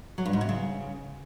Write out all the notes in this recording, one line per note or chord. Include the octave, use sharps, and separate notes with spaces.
F#3
G2
G#2
C3
C#3